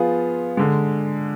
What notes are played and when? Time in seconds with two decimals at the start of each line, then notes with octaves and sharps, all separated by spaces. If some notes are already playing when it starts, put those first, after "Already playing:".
Already playing: F3 B3 F4 G#4
0.57 D3 G#3